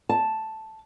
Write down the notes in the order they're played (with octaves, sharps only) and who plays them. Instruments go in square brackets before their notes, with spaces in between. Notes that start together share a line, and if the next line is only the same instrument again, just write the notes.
[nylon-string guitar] A5